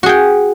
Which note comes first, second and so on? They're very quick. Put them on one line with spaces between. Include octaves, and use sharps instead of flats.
F#4 G#4 G5